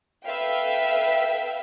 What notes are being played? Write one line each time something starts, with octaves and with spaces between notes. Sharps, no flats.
A4 B4 E5 F5 G5